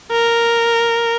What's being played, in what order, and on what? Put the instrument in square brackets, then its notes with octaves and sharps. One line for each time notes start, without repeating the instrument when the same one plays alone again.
[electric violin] A#4